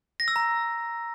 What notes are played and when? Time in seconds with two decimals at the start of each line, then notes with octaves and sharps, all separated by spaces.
0.20 A#6
0.28 E6
0.36 A#5